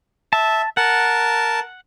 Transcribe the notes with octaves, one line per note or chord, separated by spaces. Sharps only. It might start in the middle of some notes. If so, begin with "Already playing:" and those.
E5 A5
A#4 F#5 A5